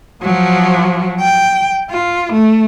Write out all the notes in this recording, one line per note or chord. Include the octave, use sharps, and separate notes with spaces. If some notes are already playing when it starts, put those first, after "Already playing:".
F3 F#3
G5
F4
A3